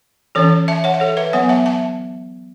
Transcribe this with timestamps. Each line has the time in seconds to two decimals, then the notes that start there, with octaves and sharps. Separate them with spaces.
0.35 E3 C#4 A4 C#5
0.68 E5 A5
0.84 C#5 F#5
0.94 E5
1.00 A4 C#5
1.17 B4 E5
1.33 F#3 B3 C#5 F#5
1.49 E5 A5
1.66 E5 A5